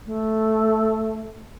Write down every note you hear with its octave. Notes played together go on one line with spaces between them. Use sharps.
A3